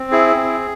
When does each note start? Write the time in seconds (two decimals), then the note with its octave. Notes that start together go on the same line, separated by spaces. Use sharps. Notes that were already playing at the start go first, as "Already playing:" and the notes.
Already playing: C4
0.11 E4 G#4
0.36 C4